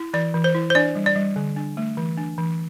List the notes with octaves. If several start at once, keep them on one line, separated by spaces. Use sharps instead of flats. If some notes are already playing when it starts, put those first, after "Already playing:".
Already playing: E4
E3 D5
E3
C5
E4
C5
D4 D5
G3
D5
G3
D3
D4
A3
E3
D4
E3